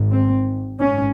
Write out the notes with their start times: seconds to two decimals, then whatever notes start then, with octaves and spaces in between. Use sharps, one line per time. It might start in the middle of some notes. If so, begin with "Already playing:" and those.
Already playing: G#1 G#2
0.11 C4
0.80 G#1 G#2 C#4